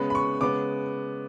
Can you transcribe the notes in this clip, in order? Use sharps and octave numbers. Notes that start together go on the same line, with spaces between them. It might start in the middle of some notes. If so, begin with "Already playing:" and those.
Already playing: C#3 G#3 B3 B5
B5
C#6
C#3 G#3 B3 D6